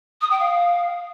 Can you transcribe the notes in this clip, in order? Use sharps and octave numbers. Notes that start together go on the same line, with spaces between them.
D#6
G5
F5